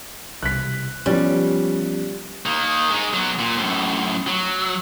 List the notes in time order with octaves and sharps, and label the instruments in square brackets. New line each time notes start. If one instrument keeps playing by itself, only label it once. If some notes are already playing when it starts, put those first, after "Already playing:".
[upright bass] E1 C2 [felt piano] F#6 B6
[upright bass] D#3 [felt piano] F3 B3 C#4 [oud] G3
[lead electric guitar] D#3 A#3
G#3 D#4
F#3 B3
A#2
F#2 A2
F#3